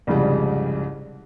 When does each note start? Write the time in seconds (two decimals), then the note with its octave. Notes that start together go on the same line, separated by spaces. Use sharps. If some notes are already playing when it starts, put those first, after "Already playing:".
0.07 C2 F2 G#2 C#3 G3